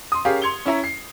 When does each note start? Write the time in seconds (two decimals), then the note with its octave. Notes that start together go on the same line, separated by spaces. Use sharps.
0.12 C6 D#6
0.25 C#4 G4 G#4 A#4 F5
0.42 C6 G#6 C#7 F7 G7
0.66 C#4 E4 E5 A#5
0.84 C7